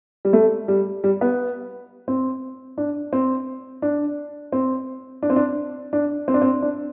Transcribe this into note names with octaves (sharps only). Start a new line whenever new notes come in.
G3
A3
G3
G3
B3
C4
D4
C4
D4
C4
D4
C4
D4
D4
C4
D4
C4
D4